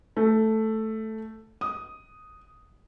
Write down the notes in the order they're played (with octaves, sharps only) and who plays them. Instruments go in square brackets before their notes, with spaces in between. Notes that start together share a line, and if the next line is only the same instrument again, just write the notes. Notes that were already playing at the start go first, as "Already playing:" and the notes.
[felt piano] A3
D#6